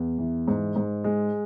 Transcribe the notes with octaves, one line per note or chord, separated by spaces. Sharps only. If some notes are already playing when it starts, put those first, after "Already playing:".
Already playing: E2
E3
G#2
G#2
G#3